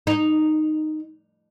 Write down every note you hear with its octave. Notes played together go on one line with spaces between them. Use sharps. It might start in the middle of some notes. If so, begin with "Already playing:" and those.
D#4